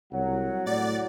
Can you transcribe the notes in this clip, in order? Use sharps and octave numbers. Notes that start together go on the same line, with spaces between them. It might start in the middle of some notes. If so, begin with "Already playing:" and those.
C2 F#3 F#5
A2 D5 A6